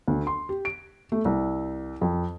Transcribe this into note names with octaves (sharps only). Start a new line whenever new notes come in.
D2
C6
G4
D7
A3
C2
F2